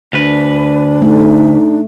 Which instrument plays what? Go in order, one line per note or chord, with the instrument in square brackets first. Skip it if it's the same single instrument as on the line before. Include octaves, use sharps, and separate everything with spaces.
[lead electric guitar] D2 B4 [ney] D4
[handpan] A3 [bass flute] D#4